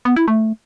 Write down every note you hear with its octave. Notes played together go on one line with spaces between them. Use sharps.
B3
E4
A3